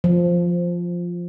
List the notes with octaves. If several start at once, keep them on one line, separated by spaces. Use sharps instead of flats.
F3